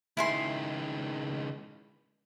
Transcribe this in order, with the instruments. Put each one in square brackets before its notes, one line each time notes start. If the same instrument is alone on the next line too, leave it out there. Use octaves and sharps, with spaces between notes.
[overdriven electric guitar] C#2 D#3 [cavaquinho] E4 G#5 C6